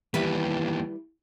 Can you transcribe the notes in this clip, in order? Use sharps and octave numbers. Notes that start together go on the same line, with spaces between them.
D#2 E3 G3 E4 B4